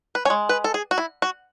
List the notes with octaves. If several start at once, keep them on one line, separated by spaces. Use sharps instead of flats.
B4
C#4 C#5
G#3
B4
A4
G#4
F#4
E4
F#4